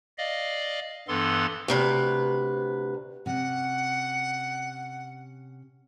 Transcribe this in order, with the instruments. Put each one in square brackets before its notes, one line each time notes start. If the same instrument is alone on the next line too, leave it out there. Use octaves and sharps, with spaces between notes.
[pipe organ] D5 D#5 F5
G2 E3 B3 A4 C6
[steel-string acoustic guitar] D2 C3 B4
[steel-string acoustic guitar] C3 C#4 [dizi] F#5